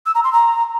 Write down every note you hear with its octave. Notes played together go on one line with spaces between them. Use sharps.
E6
A#5
C6
A#5